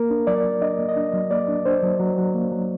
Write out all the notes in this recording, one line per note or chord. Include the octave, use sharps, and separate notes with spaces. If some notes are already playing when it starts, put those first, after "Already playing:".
Already playing: A#3 A#4
D4
F#3 D5
F#3
D4 D#5
A#3
D#5
D4
F#3
A#3 D5
D4
D4 C5
F#3
F#3
F#3
A#3
F#3